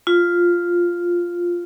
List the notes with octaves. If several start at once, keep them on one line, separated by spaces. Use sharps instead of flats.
F4